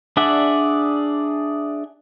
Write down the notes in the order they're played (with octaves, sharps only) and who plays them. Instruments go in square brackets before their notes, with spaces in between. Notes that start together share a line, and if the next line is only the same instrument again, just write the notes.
[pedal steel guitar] D4 G#4 D5 E5 F#5